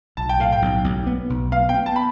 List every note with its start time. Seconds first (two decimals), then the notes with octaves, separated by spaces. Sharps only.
0.17 B1 A5
0.29 G5
0.39 A2 F5
0.52 G5
0.62 B1
0.84 B1
1.07 B3
1.30 B1
1.52 B3 F5
1.69 G5
1.74 B3
1.86 A5
1.96 B5